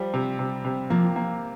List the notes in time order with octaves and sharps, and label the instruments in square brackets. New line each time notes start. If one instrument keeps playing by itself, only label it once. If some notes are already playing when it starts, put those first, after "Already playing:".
Already playing: [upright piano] F3 G3
C3
C3
C3
[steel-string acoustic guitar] F3 [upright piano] A#3
[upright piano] A#3